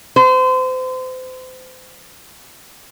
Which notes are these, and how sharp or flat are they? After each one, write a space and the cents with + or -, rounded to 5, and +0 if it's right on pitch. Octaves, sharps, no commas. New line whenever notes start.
C5 -35